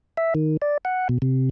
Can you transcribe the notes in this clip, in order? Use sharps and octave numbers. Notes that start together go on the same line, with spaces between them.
E5
D#3
D5
F#5
B2
C3